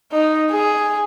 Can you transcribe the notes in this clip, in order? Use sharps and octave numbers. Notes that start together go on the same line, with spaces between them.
D#4
G#4